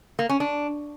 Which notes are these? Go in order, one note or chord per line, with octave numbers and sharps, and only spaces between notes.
A#3
C#4
D4